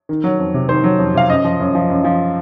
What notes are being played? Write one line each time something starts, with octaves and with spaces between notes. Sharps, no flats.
D#3
F#3
F2
C3
D#3 C5
F#3
F2
C3 F5
F#2 D#5
F3
F#2
F3
F#2
F3